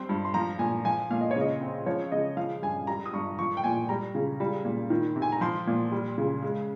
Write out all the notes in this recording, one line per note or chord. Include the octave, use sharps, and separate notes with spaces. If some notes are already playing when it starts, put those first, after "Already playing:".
Already playing: G3 C4 C6
G2
C6
F3 A#5
A#2 G#5
F3 G#5
A#2 F5
D#5
C#5
C#3 D#5
C4
F3 C#5
C#3 D#5
F3 F5
G2 G#5
G3 A#5
D#6
G2 C#6
F3 C#6
G5
A#2 G#5
G3 A#5
C#3
G3
A#2
D#3
C3
G#5
A#5
F3 C6
A#2
G3
C#3
G#3